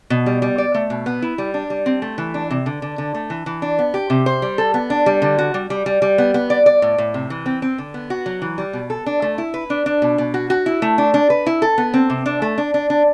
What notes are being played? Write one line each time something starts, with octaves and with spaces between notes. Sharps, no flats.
B2
G3
G3
D5
A3
B2
B3
E4
G3
D4
G3
C4
A3
E3
D4
C3
D3
D3
D3
A3
E3
E3
D4
B3
G4
C3
C5
G3
A4
B3
D4
G3
D3
F#4
G3
G3
G3
G3
B3
B3
D5
D5
A2
A2
C3
E3
C4
C4
D3
B3
F#4
F#3
E3
G3
B2
A4
D4
A3
E4
B4
D4
D4
B2
B2
F#4
F#4
E4
A3
D4
D4
B4
E4
A4
B3
C4
C3
D4
A3
D4
D4
D4